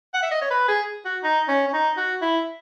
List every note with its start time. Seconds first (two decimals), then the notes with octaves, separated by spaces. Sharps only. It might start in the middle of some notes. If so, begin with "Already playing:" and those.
0.14 F#5
0.23 E5
0.31 D#5
0.42 C#5
0.51 B4
0.68 G#4
1.05 F#4
1.23 D#4
1.48 C#4
1.68 C#4
1.73 D#4
1.97 F#4
2.22 E4